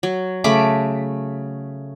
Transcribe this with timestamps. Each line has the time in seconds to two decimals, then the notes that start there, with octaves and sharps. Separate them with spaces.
0.03 F#3
0.44 C#3 A3 B5 D6